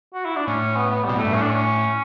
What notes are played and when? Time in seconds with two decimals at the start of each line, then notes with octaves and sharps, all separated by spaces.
0.14 F#4
0.25 E4
0.36 D4
0.47 A2 C#4
0.76 B3
0.90 B3
1.04 B2 G3
1.15 A2
1.19 A3
1.24 G2
1.33 A2 C#4
1.42 D4
1.50 C#4